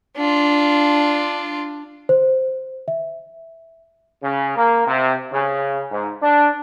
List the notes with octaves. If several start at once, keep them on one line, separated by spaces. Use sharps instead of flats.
D4 F4
C5
E5
C#3
A#3
C3
C#3
G#2
D4